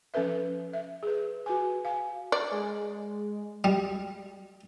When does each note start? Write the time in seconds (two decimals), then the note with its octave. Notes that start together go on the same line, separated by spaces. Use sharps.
0.14 F3 C#4 A4 B4 E5
0.73 E5
1.03 G#4 B4
1.46 F#4 B4 G#5
1.85 F5 G#5
2.32 D5
2.51 G#3
3.64 G3